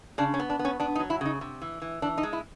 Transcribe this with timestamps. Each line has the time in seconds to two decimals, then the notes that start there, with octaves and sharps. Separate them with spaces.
0.18 C#3 D4
0.34 C#4
0.40 B3
0.50 D4
0.59 B3
0.65 C#4
0.80 B3 D4
0.95 D#4
1.00 F#3
1.10 E4
1.21 C#3 D#4
1.41 C3
1.62 E3
1.82 E3
2.02 E3 D4
2.18 D#4
2.23 G#3
2.33 E4